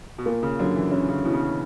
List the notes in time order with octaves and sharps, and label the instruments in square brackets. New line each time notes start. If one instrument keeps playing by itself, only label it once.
[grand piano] B2
[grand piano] A#2 [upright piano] A#3
[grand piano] C#3
[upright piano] F#2 [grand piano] D3
[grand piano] E3
[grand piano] D3 [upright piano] C#4
[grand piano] C#3
[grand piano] B2 [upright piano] E3
[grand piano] C#3
B2